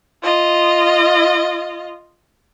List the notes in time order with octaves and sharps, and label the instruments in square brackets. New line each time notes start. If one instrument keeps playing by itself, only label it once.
[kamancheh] F4 D#5